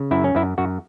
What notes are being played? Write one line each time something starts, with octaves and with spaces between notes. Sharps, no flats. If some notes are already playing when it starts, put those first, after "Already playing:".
Already playing: C#3
F#2 E4
C#4
F#2 E4
F#2 F#4